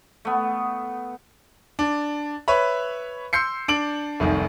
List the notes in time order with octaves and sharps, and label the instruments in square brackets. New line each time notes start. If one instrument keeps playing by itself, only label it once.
[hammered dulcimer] A3 B3
[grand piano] D4
B4 C#5 E5 B5
C6 E6 G6 C7 C#7
D4 D7 F#7
F1 C2 D#3